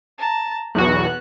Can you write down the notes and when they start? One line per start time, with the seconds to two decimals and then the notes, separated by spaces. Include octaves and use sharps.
0.18 A5 A#5
0.75 B1 E2 B3 F#4 F#6